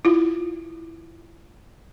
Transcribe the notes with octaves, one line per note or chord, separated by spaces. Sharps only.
E4 F4